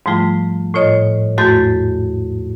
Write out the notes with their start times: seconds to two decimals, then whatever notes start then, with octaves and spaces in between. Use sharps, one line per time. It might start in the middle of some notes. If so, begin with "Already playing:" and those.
0.06 G#2 F3 G3 A3 F4
0.74 A2 F4 C#5 D#5
1.38 E2 G#2 A3 F#4 G6 A6